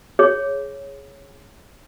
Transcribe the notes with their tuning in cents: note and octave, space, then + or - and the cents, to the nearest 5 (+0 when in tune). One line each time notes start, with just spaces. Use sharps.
G#4 +0 C#5 +0